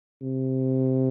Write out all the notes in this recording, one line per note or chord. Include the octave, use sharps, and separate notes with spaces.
C3